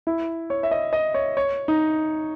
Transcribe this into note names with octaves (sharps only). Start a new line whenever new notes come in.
E4
C#5
E5
D#5
D#5
C#5
C#5
D#4